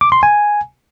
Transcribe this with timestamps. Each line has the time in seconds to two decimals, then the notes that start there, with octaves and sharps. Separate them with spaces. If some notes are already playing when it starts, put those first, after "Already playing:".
0.01 D6
0.12 C6
0.23 G#5